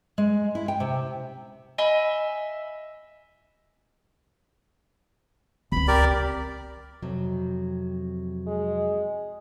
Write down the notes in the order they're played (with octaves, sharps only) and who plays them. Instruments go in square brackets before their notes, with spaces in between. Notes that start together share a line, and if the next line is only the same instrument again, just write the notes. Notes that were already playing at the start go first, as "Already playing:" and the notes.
[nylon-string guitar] G#3
E4
G5
C3
[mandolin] D#5 E5 G#5 B5
[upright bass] C#2 C4 [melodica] B5
[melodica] G4 A#4 D5
[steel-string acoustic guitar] F2 C3 F#3
[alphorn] G#3